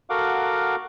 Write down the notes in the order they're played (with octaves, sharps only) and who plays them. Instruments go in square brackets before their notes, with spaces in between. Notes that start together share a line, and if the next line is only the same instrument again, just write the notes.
[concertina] F#4 A4 A#4 F5 F#5 D6